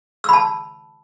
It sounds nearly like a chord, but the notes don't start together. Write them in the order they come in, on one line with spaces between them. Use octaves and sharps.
E6 B5 A5